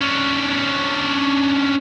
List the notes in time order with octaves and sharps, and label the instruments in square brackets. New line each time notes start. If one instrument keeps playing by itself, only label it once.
[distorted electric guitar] C#4 D4